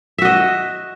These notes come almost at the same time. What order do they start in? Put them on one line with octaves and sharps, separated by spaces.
E5 F#4 D#5